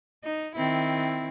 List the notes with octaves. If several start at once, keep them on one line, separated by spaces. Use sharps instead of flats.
D#4
D#3 C4 E4